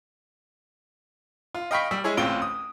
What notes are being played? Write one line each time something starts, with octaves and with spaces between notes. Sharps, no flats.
F4
D#5 F5 G5 B5 C#6 B6
G3 E6
G#3 E4 G#4 C#5
D1 A1 C4 F4 D7 G7
D#6